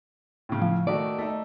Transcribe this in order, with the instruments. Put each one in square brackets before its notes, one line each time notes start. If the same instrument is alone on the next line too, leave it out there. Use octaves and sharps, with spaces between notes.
[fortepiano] A2 C#3
[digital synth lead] F3
[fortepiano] D#3 A3 F#4 [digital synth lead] D5
[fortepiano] A3 D#4